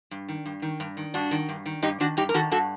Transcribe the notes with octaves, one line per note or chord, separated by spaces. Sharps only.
G2
D#3
G2
D#3
G2
D#3
G2 D4 F#4
D#3
G2
D#3
G2 D#4 G4
D#3 D4 F#4
G2 D#4 G4
A#4
D#3 F#4 A4
G2 F#4 A4